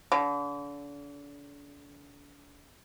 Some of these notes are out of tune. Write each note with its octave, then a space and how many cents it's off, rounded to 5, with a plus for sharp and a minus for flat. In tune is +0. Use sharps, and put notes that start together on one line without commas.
D3 -40